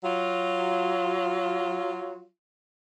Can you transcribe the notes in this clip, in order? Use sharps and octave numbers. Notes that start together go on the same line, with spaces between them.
F#3 F4